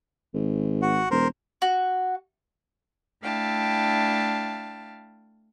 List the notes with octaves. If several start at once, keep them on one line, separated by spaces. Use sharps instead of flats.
G#1
F#4 F#5
E1 A#4 C5
F#4
A3 D4 E4 F5 G5 A5